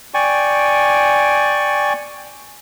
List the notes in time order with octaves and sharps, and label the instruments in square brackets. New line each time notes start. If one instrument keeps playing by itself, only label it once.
[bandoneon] D5 G5 G#5 C#6